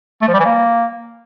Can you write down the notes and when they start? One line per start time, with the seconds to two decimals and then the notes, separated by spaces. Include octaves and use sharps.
0.22 A3
0.28 F3
0.34 G3
0.40 E3
0.45 A#3